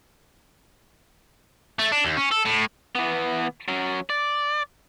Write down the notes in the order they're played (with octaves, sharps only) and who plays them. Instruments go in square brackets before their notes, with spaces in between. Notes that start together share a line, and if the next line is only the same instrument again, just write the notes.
[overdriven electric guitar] A3
D4
D#2
C#4
A4
A2
[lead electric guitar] E3 B3
F#3 C#4
D5